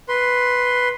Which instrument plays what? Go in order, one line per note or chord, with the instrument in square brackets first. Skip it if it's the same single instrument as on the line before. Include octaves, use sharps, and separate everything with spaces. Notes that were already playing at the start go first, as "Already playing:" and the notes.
[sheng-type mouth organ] B4 C6